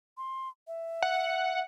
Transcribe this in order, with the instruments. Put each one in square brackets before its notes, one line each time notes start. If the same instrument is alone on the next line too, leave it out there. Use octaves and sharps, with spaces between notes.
[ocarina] C6
E5
[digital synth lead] F#5